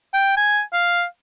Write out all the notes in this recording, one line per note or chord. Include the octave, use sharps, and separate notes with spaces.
G5
G#5
F5